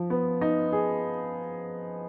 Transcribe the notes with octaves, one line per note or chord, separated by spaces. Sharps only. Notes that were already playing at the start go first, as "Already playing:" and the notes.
Already playing: F3
B3
D#4
G#4